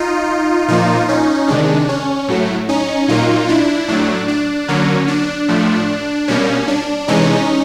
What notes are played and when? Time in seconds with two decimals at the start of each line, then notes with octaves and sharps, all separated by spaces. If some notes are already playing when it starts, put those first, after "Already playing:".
Already playing: D#4 F4
0.68 A#2 F3 A#3 D#4 F4
1.08 C#4 D#4
1.48 C3 D#3 G#3 D4
1.89 C#4
2.28 A2 F#3 A3
2.69 C#4 D#4
3.08 A#2 F#3 A#3 D#4 F4
3.48 D4 E4
3.88 A2 F#3 A3 D4
4.28 D4
4.68 D3 F#3 A#3 C#4
5.08 D4
5.48 A2 F3 A3
6.28 B2 G3 A#3 C#4
6.68 D4
7.08 C3 E3 G#3 C#4 D#4